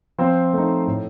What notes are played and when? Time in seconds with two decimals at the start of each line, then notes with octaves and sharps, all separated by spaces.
0.18 F3 C4 C5
0.53 A3 D#4
0.87 A2